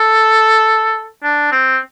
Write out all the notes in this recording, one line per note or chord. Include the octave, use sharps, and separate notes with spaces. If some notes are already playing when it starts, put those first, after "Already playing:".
Already playing: A4
D4
C4